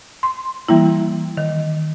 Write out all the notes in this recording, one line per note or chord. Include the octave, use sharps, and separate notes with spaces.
C6
E3 G3 A#3 E4
D#3